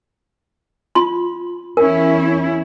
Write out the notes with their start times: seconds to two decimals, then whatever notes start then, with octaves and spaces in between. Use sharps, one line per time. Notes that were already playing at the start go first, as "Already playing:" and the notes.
0.95 F4 C6
1.77 E2 C#4 E4 A#4